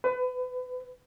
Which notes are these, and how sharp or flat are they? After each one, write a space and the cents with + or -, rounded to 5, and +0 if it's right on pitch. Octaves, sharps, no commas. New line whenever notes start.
B4 +30